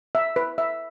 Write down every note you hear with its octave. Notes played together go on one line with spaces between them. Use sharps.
E5
B4
E5